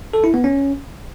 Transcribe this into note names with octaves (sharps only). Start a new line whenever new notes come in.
A4
E4
B3
C#4